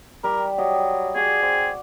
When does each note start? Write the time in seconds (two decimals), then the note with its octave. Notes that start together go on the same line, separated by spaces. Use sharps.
0.24 G3 G4 A#4
0.58 F#3 G4 D#5
1.15 F#4 G#4 D5 F#5
1.42 C4